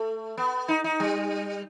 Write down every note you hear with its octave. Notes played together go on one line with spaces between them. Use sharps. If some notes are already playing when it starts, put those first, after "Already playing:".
Already playing: A3
B3
D#4
D#4
G3